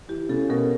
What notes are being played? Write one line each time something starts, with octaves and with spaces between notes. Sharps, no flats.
E3 G4
C#3 A4
B2 A#4